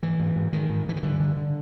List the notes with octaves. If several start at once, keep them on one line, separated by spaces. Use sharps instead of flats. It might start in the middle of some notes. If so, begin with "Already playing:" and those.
G#2 E3
G#2
G#2
G#2 D#3
G#2
G#2 E3
D#3
G2 D3
D3
D3